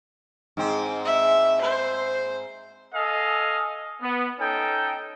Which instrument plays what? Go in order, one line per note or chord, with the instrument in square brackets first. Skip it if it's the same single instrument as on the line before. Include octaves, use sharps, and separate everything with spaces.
[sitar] G#2 C4
[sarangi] E5
C5
[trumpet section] A4 D#5 F5 G#5
B3
C#4 D#4 A4 G5